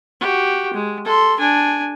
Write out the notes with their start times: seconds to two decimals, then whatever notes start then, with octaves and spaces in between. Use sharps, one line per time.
0.21 F#4 G4
0.74 G#3
1.05 A4 C6
1.39 D4 G#5